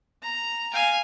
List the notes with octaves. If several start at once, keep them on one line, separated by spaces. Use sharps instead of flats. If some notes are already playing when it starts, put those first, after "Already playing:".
A#5
F5 G#5